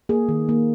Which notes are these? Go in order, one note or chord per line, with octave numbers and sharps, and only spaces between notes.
A#3 G#4
D#3
A#3